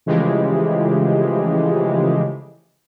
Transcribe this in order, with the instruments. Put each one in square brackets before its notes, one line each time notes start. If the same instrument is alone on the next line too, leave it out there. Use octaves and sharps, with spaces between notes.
[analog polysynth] C#3 E3 F3 G#3 A3 G4